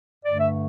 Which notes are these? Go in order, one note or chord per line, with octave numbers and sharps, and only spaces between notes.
G2 D3 A3 D5
E5